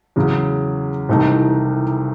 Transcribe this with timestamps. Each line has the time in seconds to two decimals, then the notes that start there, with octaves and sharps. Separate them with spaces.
0.16 E2 C#3 F#3
1.09 C2 C3 E3 A3 D#4